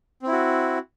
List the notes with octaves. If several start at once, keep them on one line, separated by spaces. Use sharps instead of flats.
C4 E4 F#4